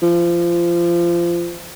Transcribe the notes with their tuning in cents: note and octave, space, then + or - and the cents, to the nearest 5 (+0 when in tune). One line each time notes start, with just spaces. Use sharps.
F3 -25